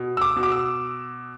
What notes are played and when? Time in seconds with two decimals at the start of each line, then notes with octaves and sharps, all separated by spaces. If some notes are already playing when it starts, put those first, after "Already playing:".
Already playing: B2
0.17 E6
0.21 D6
0.36 B2
0.43 D6
0.52 E6